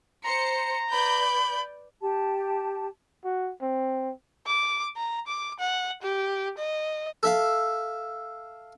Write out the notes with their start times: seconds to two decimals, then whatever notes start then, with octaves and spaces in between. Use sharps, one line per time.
0.25 C5 A#5 C#7
0.92 B4 D5 B5 G6
2.01 G4 A5
3.24 F#4
3.61 C4
4.47 D6
4.96 A#5
5.27 D6
5.60 F#5
6.03 G4
6.58 D#5
7.23 A4 E5 F5